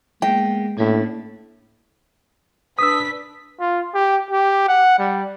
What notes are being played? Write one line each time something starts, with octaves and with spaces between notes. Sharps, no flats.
G#3 A#3 B3 G5
A2 A#3 C#4 D4
D4 B4 D#6 E6 B6
F4
G4
G4
F#5
G3